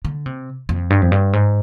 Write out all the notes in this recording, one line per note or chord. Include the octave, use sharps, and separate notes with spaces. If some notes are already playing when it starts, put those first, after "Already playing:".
D3
C3
F2
G2
F2
G2
G#2